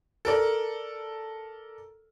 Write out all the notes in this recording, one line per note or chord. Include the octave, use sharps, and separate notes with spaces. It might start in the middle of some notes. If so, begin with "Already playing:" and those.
A4 A#4 D5